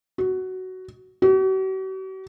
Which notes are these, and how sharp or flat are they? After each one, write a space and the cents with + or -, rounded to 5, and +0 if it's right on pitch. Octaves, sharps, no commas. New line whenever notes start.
F#4 +10
F#4 +45